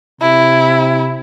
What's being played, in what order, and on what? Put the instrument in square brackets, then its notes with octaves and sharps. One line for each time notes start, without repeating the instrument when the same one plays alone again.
[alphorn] C3 [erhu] E4